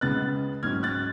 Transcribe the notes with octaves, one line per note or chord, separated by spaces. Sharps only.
C#2 C#3 G#3 B3 F#6 A6
G#2 F#3 C#4 F6 G#6
F#6 A6